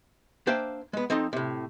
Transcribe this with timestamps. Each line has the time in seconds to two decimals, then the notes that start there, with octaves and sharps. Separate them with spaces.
0.47 A#3 D4 C5 E5 F5 G5
0.93 G#3 B3
1.10 F3 C4 D#4 A4 C6
1.33 A2 C3